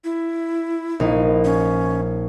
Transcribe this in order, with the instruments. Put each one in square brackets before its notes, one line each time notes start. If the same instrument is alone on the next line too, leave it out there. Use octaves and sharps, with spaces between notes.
[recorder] E4
[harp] A#1 D#4
[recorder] C#4